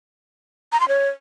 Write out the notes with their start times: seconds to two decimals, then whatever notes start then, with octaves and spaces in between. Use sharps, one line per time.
0.72 A#5
0.80 C6
0.88 C#5